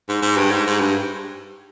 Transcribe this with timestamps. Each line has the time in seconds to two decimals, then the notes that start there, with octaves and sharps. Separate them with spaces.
0.09 G#2
0.22 G#2
0.37 G2
0.51 G#2
0.67 G#2
0.80 G2